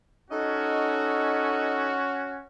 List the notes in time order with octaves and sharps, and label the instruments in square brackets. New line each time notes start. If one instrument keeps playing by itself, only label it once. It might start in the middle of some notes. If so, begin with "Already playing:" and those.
[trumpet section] C#4 F#4 [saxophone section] D#4 A4 D#5